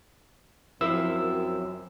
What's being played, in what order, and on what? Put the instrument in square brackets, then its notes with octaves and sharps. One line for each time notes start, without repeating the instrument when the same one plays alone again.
[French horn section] F#2 C4 [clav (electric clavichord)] F3 E4 [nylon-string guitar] A#4 C5 [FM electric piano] E6